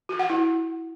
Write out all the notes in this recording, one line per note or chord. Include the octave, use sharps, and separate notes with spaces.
F#4
F#5
E4